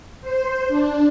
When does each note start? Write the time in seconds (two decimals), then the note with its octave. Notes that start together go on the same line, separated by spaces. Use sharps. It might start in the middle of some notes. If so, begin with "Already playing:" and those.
0.21 C5
0.68 D4